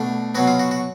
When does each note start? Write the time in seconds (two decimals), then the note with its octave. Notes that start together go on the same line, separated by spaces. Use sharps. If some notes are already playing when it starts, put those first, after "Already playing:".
Already playing: B2 A3 D4
0.35 B2 F#3 B3 F#4
0.47 F4
0.59 F#4
0.71 F#4